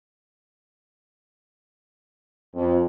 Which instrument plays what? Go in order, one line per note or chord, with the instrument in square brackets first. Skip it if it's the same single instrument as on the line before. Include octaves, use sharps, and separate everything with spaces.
[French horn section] F2